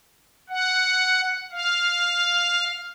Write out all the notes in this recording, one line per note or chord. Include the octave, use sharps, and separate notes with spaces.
F#5
F5